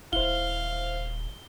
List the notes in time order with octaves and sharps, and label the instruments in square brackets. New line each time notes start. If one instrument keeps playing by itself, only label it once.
[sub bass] D#1 [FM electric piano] E4 C5 [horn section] F5 [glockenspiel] G7